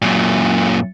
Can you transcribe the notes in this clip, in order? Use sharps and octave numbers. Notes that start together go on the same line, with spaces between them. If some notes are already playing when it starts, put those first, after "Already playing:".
F#2 A#2